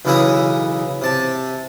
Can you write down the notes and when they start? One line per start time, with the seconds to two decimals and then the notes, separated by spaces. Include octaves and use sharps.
0.05 B1 C#3 E3 E4 A#5 D#6
1.02 C3 A5